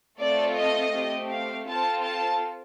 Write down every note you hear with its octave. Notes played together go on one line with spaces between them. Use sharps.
A3 C4 F4 A4 D5
D#5
A3 C4 G4
F5
C4 F4 A4 A5
A5